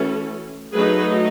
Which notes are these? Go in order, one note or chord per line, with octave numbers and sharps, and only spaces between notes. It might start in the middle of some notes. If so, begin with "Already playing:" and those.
Already playing: E3 A3 C#4 F#4 A4
F#3 A3 D#4 G#4 B4